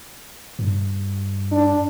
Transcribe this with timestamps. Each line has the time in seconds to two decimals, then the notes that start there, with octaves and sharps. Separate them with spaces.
0.59 G2
1.52 D4